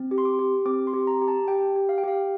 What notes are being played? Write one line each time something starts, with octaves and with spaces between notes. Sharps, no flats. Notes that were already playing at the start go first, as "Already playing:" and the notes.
Already playing: C4
G4
C6
D6
G4
C4 D6
C6
G4
A#5
G4
A5
G4 G5
G4
F5
G5
G4 F5